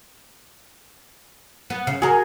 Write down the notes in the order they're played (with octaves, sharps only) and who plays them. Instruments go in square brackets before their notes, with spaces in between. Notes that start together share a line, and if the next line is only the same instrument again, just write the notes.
[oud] B3
C#3
[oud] F#4 A#4 [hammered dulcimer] G#4